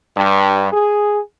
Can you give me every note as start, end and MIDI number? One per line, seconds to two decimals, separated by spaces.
0.16 0.69 43
0.72 1.19 68